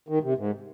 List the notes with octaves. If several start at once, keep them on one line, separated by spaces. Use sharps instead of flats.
D#3
C3
G#2